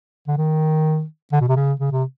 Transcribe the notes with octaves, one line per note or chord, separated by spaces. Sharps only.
D3
D#3
D3
B2
C3
C#3
C#3
C3